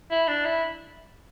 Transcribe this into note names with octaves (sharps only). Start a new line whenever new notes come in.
E4
D4
E4